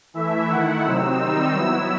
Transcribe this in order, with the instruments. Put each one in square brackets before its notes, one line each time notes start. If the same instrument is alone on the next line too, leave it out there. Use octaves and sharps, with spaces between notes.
[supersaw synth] E3 A3 E4 E5
D#3 A3 E4 F#5
C3 F#3 C4 D#4 E6
D#3 G3 C4 D#4
F#3 B3 E4